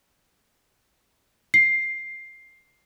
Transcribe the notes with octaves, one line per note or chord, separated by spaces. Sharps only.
C7